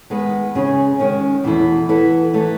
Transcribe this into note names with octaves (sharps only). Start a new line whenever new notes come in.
D#3 G#3 B3
C#3 G#3 C#4 G#4
D#3 G#3 C#4
E2 B2 A3 E4
E3 B3 E4 A4
E3 A3 D#4